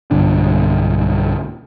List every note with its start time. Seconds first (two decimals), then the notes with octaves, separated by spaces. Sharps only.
0.11 B1 G2 D3 D4